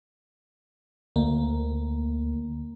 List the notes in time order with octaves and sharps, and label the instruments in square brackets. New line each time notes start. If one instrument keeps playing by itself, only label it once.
[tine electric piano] D2 [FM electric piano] A#3